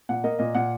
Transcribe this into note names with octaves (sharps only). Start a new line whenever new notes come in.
A#2 F#5
A#3 D#5
A#2 D#5
A#2 F#5